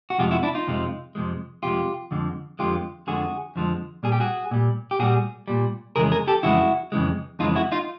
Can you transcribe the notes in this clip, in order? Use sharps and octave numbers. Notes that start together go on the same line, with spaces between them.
F#4
F2 C3 F3 G#3 F4 G4
E4 F#4
D4 E4
D#4 F4
F2 C3 F3 G#3
F2 C3 F3 G#3
F2 C3 F3 G#3 F4 G4
F2 D3 F3 G#3
F2 D3 F3 G#3 F4 G4
F2 D3 F3 G#3 F#4 G#4
F2 D3 F3 G#3
A#2 G3 G#4
G4
F#4 G#4
A#2 G3
G4
A#2 G3 F#4 G#4
A#2 G3
F2 C#3 E3 G#3 G#4 A#4
G#4 A#4
G4 A4
F2 C#3 E3 G#3 E4 F#4
F2 C#3 E3 G#3
F2 C#3 E3 G#3 D#4 F4
E4 F#4
D#4 F4